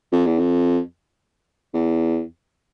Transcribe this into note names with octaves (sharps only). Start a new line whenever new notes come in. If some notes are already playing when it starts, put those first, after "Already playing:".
F2
E2
F2
E2